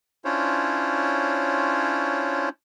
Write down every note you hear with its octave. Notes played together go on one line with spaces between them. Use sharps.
C#4 D4 E4 F4 C5 C#5